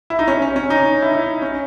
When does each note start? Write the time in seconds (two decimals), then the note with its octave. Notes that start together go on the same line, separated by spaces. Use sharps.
0.10 E4
0.19 D#4
0.28 C#4
0.42 C#4
0.56 C#4
0.70 D#4
1.02 E4
1.13 D#4
1.42 C#4